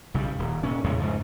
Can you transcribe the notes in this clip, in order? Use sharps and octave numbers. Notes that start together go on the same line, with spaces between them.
B1 C#3 G3
D#1
A#2 C#4
E2 A2 C#3 G#3
G#2 C#3 F3